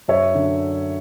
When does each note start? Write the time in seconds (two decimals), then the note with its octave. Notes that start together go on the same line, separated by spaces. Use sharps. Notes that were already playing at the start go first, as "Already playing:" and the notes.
0.08 F#2 C#5 E5
0.35 D3